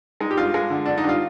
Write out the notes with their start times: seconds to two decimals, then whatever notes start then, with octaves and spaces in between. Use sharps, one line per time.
0.20 G#3 D#4
0.31 G4
0.37 G2 F4
0.54 G#3
0.70 D3
0.86 D3 D4
0.98 D#4
1.04 G2 F4